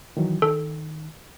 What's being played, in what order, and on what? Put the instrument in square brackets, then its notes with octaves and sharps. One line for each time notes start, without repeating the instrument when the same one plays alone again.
[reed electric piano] D#3 E3 F#3
[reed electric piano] D#3 [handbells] A4